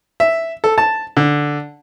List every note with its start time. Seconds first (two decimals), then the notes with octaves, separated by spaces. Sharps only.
0.20 E5
0.64 A4
0.78 A5
1.17 D3